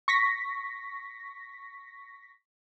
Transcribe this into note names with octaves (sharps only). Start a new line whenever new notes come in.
C#6 A#6 B6